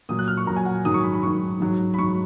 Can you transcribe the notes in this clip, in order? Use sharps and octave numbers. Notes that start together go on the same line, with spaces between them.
A#2 F#3 D#6
F#6
F6
C#6
A#2 F#3 A#5
G#5
F#5
G#2 D#3 F#3 D#6
C#6
B5
B5
G#2 D#3 F#3 C#6
G#2 F#3
B5
G#2 F#3 C#6